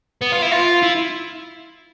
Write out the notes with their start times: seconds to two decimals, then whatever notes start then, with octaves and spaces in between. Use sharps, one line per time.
0.21 B3
0.32 F4
0.42 E4
0.51 F4
0.83 E4